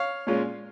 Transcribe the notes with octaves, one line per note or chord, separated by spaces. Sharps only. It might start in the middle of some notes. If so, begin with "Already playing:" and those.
Already playing: C#5 F5
A#2 G#3 C#4 F4